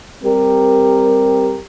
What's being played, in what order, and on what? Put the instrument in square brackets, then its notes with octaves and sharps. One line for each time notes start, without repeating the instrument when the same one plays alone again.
[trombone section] G3 C4 G4 A#4